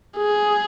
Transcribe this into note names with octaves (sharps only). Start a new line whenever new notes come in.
G#4